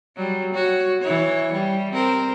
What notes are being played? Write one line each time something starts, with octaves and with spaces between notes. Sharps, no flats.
F#3 G3
F#4 C#5
E3 C#5
G3
C4 A#4 C5